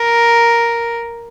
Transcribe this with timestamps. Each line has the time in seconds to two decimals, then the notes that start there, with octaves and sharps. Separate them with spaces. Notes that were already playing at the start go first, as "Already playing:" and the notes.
Already playing: A#4